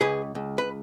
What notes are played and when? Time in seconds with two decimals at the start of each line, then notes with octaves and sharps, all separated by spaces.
0.01 C#2 G#4 B4
0.35 C#2
0.58 B4